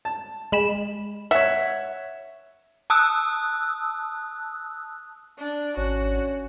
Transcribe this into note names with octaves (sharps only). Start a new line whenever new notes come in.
A5
G#3 B5 E7
C#5 E5 F#5
A5 D#6 E6 F#6
D4
G#1 C#4 F#4